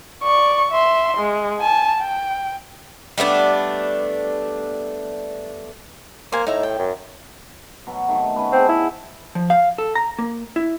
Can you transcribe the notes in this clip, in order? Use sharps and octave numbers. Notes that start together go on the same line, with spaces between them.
D5 C#6
E5 C6
G#3
G#5 A5
G5
G3 A3 B3 D4
A#3 C5 G#5
A2 D#4 E5 A#5
G5
F#2
B2 F#3
C3 D#3 A3
B3 C#4 B4
C4 G#4 F#5 A5
E4
F3
F5
A4
A#5
A#3
E4